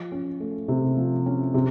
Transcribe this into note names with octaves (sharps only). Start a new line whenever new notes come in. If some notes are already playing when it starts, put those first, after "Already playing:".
Already playing: F3
C#4
A3
C3
F3
C#4
C3